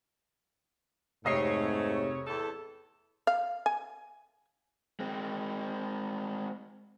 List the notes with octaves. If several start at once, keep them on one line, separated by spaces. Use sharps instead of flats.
F1 G#2 C3 A3 C#5 D#5 C7
E2 A2 A4
F5
G#5
G#3 C4